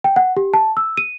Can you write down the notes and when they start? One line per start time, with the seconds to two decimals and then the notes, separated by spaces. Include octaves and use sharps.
0.04 G5
0.16 F#5
0.37 G4
0.54 A5
0.77 E6
0.97 D#7